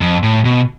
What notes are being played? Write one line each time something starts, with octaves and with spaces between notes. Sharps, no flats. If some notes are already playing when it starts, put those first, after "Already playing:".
F2
A2
B2